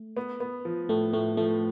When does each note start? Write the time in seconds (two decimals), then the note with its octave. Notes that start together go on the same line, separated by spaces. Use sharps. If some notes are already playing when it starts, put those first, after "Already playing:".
Already playing: A3
0.17 B3
0.40 B3
0.65 F3
0.89 A2 A3
1.13 A2 A3
1.37 F3 A3